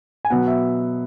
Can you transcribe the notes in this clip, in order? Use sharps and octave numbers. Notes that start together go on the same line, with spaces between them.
G#5
B2 F#3 B3 F#5
E5